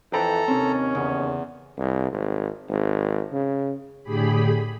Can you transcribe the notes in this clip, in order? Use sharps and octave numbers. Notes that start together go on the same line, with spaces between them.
F2 E3 A4 C5 G5 A#5 B5
D#2 C3 D#3 C4 C#4
E2 C#3
C2
G#1
G#1
C#3
A2 D3 G4 G#4 B5